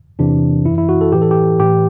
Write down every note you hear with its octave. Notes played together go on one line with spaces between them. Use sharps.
E2 C3 E3 D4
F#2 E3 E4
E4
F#4
A4
A2 E3 G4
A4
G4
A2 E3 G4